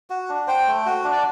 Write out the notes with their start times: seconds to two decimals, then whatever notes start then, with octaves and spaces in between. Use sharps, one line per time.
0.10 F#4
0.29 D4
0.47 C5 G5
0.67 A3
0.86 F#4
1.04 D4
1.12 D5